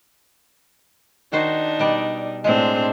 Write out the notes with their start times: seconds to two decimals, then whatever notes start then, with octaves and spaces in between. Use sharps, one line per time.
1.32 D#3 D4 D#4 F#4 C5
1.79 B2 G3 D5
2.44 A2 G#3 C4 D4